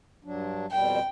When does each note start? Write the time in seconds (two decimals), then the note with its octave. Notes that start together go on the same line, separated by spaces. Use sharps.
0.24 G2 F#3 D4
0.71 F2 B2 G3 G5